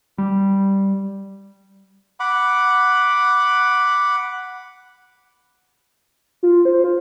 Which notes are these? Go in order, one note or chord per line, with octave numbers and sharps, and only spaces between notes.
G3
F#5 B5 D6
F4
C5
F4